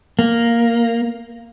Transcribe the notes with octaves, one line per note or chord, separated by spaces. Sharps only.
A#3